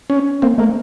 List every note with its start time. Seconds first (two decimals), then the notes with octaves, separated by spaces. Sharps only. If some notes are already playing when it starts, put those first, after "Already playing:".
0.10 C#4
0.42 A#3 C4
0.58 A3 A#3